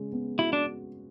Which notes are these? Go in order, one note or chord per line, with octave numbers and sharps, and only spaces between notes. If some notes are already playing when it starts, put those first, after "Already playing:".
Already playing: C#3 G#3
B3
E4 F#4
D4